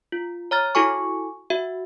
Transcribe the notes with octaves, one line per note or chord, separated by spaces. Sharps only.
F4
C#5 A#5 F6 A6
E4 F#4 A4 G#5 C#6
F#4 E5